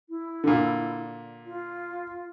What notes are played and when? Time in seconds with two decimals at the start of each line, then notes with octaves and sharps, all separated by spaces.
0.09 E4
0.44 A#2 D3
1.46 F4